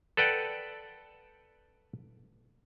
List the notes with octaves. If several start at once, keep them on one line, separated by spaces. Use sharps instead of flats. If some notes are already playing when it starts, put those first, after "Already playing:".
A4 B4 D5 F#5 G5